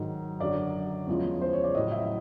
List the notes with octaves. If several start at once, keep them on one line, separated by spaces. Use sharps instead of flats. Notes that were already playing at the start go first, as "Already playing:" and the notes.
Already playing: G#2 D#3 F#3
F#2 D3 F#3 D5
E2 C#3 F3 G#3
C5
C#5
D5
A2 F#3 D#5
E5